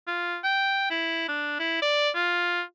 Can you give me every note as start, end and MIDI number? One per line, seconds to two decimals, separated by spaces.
0.07 0.37 65
0.44 0.88 79
0.90 1.28 64
1.28 1.59 62
1.59 1.81 64
1.82 2.10 74
2.15 2.62 65